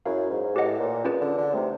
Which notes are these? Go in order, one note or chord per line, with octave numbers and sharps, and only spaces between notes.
F#2 C#4 E4 G#4 C#5 F5
G#2
A2 G4 B4 D#5 F#5
A#2
C#4 F4 G#4 B4 D5
D3
D3
C3 A3 C4 D#4